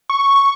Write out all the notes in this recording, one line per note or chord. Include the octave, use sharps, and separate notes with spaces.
C#6